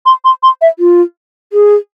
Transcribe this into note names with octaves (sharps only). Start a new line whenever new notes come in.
C6
C6
C6
E5
F4
G#4